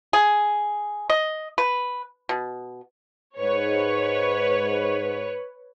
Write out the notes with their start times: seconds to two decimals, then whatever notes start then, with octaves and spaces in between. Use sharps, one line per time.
0.13 G#4
1.10 D#5
1.58 B4
2.29 B2
3.39 G#2 B4 C#5